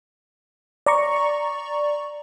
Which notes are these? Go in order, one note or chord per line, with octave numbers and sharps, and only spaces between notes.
D5 A#5 C#6